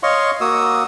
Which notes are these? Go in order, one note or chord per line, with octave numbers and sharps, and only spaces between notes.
C#5 D#5 F5 C6 C#6
A#3 F#4 D#6 E6